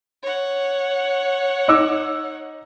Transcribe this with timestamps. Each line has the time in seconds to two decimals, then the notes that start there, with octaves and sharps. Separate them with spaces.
0.23 C#5 F#5
1.68 D#4 D6 E6